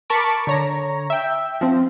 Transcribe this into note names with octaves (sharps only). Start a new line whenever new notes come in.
A#4 A5 B5 C#6 D6
D3 C#5 A#5
E5 G5
F3 C4